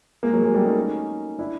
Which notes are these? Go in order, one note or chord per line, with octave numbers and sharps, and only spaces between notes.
G#3 A#3
F#3 G#3
F#3 G#3
G3 A3
C#4 D#4
D4 E4